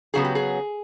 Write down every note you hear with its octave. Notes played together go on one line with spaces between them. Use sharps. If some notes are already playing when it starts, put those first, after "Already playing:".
C#3 F#3 B3 G#4
G4
G#4